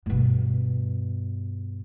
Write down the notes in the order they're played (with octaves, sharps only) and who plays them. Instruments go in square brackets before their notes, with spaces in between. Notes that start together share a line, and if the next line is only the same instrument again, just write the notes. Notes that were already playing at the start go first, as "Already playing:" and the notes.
[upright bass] G2 B2